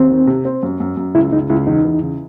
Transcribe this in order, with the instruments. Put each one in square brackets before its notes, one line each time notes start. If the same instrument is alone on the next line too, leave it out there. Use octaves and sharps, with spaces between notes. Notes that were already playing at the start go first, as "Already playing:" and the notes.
Already playing: [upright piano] D#2 [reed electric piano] C4
[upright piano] D#3
C3
C4
F#2
F#2
F#2
[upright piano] C#2 [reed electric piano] E4
[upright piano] C#2 [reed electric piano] D#4
[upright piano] C#2 [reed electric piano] E4
[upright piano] E2 [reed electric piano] D#4
[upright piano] E3
C#3